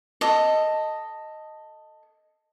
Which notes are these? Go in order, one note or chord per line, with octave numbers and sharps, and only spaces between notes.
A4 D#5